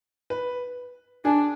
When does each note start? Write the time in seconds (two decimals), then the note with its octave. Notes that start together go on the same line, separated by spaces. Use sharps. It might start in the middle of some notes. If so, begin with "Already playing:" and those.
0.30 B4
1.25 D4 G#4